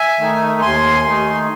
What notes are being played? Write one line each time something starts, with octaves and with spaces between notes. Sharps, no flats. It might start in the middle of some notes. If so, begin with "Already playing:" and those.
Already playing: E5 G#5
D#3 A3 D#4
D#2 G#5 C6
D#3 A3 D#4